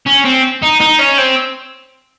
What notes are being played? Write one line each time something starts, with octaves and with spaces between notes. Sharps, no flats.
C#4
C4
D#4
D#4
C#4
C4